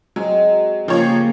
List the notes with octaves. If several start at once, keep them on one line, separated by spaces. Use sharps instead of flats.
F#3 G#3 C4
C#3 F3 A#3 C#4 G4 C#5